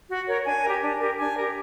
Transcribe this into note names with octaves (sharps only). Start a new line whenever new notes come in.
F#4
A#4 C#5
D4 G#5
G4 A#4
D4
G4 A#4
D4 G#5
G4 A#4